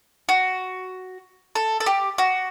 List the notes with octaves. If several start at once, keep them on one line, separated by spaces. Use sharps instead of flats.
F#4
A4
A4
G4
F#4